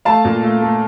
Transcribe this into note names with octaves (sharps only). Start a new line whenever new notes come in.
A3 F5 A5
A#2
A3
A3